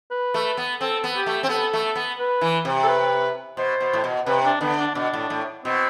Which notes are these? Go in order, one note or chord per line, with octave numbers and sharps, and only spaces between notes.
B4
A3
B3
C4 A4
B3
G4
A3
C4
B3 A4
A3
B3
B4
E3
C3
A4
B4
B2 C5
B2
A2
B2
C3 B4
D4
D3 B3
D4
B2 D4
A2
A2
B2 C4